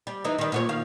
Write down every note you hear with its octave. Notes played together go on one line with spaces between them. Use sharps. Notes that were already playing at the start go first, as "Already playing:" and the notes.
G3
E3 D#4
D#3 G3
A#2 F#4 C#5
D#3 F5